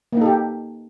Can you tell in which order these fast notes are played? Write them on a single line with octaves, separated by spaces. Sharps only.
A#3 D#4 A4 G4